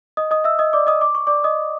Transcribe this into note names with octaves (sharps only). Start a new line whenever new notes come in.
D#5 D#6
D#5 D#6
E5 E6
D#5 D#6
D5 D6
D#5 D#6
D6
C#6
D5 D6
D#5 D#6